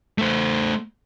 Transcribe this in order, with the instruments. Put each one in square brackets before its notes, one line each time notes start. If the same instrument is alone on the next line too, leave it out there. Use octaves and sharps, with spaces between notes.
[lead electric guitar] A3 C5